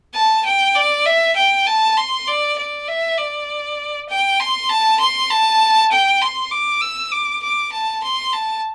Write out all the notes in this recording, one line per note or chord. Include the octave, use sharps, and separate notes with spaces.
A5
G5
D5
E5
G5
A5
C6
D5
D5
E5
D5
G5
C6
A5
C6
A5
G5
C6
D6
E6
D6
D6
A5
C6
A5